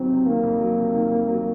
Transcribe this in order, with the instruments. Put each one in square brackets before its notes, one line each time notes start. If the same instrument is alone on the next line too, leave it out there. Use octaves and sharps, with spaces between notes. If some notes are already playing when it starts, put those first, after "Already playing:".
Already playing: [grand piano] F2 D#3 F#3 [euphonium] C4
[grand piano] C3
[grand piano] D#3 [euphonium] A#3
[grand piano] F2
F#3
C3
D#3
F2
F#3